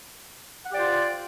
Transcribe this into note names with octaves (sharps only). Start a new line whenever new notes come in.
F4 G4 C5 D5 F#5